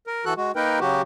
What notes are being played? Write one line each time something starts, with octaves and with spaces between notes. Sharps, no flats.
A#4
E3 F#4 A4 F#6
G#3 F#4
A#3 D#4 A#4 B4 G5
C#3 F#3 F#4 G4